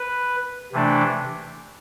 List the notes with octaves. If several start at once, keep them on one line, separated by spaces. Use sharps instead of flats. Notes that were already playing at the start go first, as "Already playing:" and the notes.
Already playing: B4
C3 E3 A3 D4